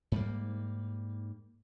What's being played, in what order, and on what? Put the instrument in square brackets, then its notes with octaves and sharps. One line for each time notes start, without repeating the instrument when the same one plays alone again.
[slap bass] G#2 G3 A#3